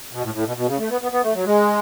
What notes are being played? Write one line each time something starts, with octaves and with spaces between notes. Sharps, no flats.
B2
A2
A2
B2
B2
C#3
A3
B3
B3
B3
A3
F#3
G#3